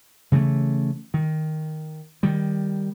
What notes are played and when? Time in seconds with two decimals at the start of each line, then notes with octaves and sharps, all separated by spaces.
0.32 C#3 E3 G#3 A3
1.14 D#3
2.23 D#3 G3